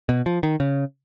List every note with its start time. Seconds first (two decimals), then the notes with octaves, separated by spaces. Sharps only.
0.09 B2
0.26 F3
0.43 D#3
0.60 C#3